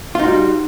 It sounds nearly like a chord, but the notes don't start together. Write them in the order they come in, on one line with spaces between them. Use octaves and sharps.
F4 D#4 F#4 G3